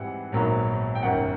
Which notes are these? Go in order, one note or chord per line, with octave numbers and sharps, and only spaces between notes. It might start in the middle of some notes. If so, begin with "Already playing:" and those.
Already playing: G#2 E3 G3 C4 F#5
A#1 G#2 D#3 F#3 B3
G5
G1 F#2 D#3 F#5